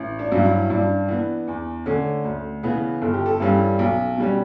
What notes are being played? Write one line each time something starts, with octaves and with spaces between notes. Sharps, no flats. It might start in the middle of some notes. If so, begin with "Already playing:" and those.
Already playing: A1
D4
G2 F#3 C#4
E4
G2 D4
E3 B3
E2
D3 A3 C#4
D2
C#3 E3 B3
G1 A4
G4
A4
G2 E3 G3 C#4
B1
B2 G3 C#4